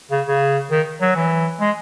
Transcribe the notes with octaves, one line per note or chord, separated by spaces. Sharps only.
C#3
C#3
D#3
F#3
E3
G#3